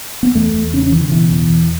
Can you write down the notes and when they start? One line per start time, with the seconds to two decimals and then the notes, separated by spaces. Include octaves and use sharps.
0.23 B3
0.35 E2 A3
0.54 E2
0.73 C#3 C#4
0.83 C#4
0.92 C#3 E3
1.01 D3
1.11 B2 E3
1.31 E2
1.49 E2